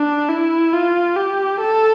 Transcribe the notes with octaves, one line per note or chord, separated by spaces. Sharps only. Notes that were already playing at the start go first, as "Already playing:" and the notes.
Already playing: D4
E4
F4
G4
A4